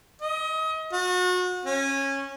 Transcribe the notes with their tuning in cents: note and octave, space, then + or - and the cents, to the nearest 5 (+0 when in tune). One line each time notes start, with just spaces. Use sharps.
D#5 +30
F#4 -35
C#4 -15